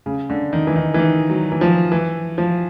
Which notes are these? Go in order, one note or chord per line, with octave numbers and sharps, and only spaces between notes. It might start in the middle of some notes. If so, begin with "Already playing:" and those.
C#3
D3
D#3
E3
D#3
E3
D#3
F#3
E3
F3
E3
F3